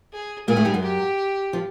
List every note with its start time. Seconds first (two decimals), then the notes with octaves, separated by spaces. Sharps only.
0.13 G#4
0.48 A#2 A#3 G#4
0.56 A2 A3
0.65 G2 G3
0.74 F#2 F#3
0.83 G4
1.53 F3